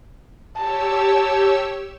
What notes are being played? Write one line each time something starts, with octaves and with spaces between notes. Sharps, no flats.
G4 C#5 A5 E6